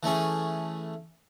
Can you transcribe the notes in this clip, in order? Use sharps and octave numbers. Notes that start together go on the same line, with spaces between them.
E3 A3 C#4 G#4